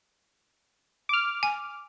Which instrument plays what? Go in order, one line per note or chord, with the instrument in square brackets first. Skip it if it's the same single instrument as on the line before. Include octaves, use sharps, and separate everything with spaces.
[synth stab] D6 F6
[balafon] G#5